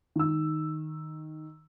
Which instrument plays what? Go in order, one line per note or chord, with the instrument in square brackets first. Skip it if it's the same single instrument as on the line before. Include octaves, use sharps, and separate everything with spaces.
[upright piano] D#3 E6